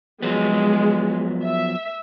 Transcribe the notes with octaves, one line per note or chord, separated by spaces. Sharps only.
F3 F#3 G#3 B3
E5